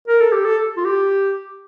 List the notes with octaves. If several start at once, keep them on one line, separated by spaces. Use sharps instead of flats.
A#4
A4
G4
A4
F4
G4